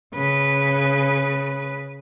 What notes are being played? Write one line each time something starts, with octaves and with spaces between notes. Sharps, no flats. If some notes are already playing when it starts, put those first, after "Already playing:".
C#3 B4